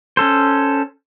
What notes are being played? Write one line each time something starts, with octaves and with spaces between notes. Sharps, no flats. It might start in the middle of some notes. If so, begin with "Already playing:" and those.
C#4 A4 C5